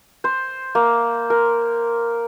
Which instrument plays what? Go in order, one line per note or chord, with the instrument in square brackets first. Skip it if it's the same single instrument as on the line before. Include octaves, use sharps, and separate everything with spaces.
[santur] C5
A#3
A#4